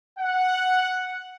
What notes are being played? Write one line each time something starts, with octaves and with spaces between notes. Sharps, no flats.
F#5